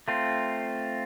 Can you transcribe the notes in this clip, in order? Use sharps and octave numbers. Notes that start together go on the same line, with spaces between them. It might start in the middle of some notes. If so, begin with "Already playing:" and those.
A3 C4 F4